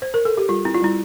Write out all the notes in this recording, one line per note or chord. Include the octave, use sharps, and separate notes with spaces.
C5
A#4
A4
G4
G3 F4
C4 E4
F4
G3 E4